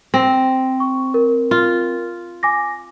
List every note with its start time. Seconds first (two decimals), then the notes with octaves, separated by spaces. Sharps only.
0.14 C4 A#6
0.80 C#6
1.14 A#4
1.51 F4
2.43 G#5 D6 A#6